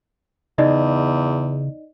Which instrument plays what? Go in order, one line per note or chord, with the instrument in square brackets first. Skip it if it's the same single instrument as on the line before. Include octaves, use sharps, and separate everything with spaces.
[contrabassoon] E2 [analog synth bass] C#3 [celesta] D#4 D5 D#5